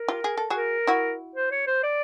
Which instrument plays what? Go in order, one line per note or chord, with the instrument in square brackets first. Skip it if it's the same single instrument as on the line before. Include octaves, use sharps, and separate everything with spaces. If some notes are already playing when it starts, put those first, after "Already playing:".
Already playing: [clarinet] A#4
[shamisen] F4 G4
G#4
A4
F#4 G#4
[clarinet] A#4
[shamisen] E4 F#4
[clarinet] C5
C#5
C5
D5